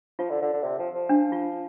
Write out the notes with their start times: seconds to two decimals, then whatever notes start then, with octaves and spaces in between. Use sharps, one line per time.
0.19 F3 F4
0.30 D3
0.42 D3
0.53 D3
0.63 C3
0.79 F3
0.94 F3
1.09 D4
1.32 F4